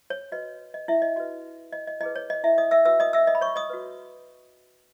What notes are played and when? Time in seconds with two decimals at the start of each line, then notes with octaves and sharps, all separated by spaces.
0.10 C#5
0.32 F#4 B4 D#5
0.74 D#5
0.88 E4 E5
1.02 D#5
1.16 F#4 B4 D#5
1.73 D#5
1.87 D#5
2.01 E4 D#5
2.03 G#4 B4
2.16 C#5
2.30 D#5
2.44 E4 E5
2.58 D#5 D#6
2.71 E5 E6
2.85 F#4 B4 E5 E6
3.00 D#5 D#6
3.13 E5 E6
3.27 D#5 D#6
3.35 B5
3.41 C#5 C#6
3.56 D#5 D#6
3.70 F#4 B4